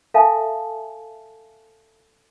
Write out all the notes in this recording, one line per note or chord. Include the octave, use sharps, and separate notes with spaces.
A4 E5 F5 G#5 A5